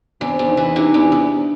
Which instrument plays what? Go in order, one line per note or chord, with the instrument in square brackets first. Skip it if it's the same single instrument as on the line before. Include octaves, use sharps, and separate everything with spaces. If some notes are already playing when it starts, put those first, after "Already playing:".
[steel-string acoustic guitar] E2 [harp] C4 D4
[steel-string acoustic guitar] E2
[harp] C#4 D#4
[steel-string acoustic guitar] E3
[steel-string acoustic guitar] C3 [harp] D4 E4
[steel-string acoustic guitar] E2
E2